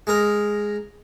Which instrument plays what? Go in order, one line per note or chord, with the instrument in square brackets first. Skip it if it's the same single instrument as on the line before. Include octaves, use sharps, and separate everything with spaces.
[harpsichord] G#3 A#4